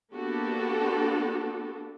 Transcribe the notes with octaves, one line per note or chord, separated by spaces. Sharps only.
A#3 B3 D4 F#4 G4 A4